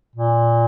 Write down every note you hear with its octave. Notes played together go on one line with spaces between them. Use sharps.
A#2